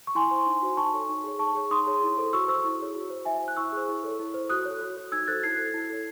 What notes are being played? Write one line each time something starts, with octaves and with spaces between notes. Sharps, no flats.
C#6
E4 G#5 C6
C5
D#4
F#4 C5
D#4 A5 C#6
A4 C#5
D#4
G#4 C#5
D#4 A5 C#6
G#4 C#5
D#4 C6 D#6
G#4 C#5
E4
A4 C5
F#4 C#6 E6
C5 C#6 E6
E4
G#4 C#5
F#4
C5
E4 E5 G#5
C5
F#6
E4 C#6 E6
G#4 C5
E4
A4 C#5
E4
C5
F#4 D#6 F#6
C#5
A4
F#4
C#5
D#4 E6 G#6
F#4 A4 C5 F#6 A6
E4 G#6 C7
A4 C5
E4
A4 C#5